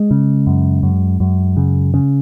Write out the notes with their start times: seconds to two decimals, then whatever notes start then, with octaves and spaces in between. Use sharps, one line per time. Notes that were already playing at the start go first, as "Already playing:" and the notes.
Already playing: G#3
0.11 C#3
0.47 F#2
0.83 F#2
1.20 F#2
1.57 C#3
1.94 C#3